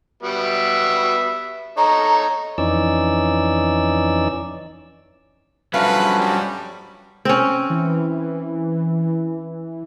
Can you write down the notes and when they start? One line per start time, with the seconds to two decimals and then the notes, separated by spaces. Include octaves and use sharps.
0.23 G3 B3 F#4 E5
1.77 D#4 A4 C#5 A#5
2.58 F2 E3 C#4 D#4 D5 E6
5.74 G2 F3 F#3 A3 C#4 B4 F5
6.20 G3
7.25 C4 C#4
7.70 E3